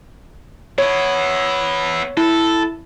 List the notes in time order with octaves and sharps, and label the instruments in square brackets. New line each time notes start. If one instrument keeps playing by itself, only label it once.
[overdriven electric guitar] B3 E4 [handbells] C#5
[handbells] E4 [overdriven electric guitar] A4